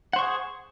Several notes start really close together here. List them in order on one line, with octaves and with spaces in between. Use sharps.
F#5 C5 C#6 G#4